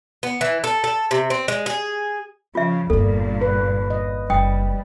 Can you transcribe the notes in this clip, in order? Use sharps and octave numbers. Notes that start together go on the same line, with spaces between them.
B3
E3
A4
A4
C3
C4
G#3
G#4
C#3 F3 F4 E5
G1 E2 G2 A#2 A#3 A4
B4
D#5
F#1 G3 G5 D#6